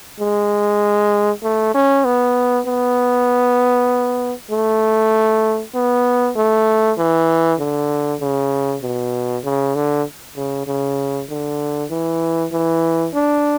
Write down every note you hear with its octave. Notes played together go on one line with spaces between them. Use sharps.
G#3
A3
C#4
B3
B3
A3
B3
A3
E3
D3
C#3
B2
C#3
D3
C#3
C#3
D3
E3
E3
D4